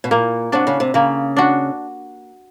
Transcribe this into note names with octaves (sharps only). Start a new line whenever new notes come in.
B2
A#2 A#3
C3 D4 F#4
C#3
C3
C#3 A#3
D4 F#4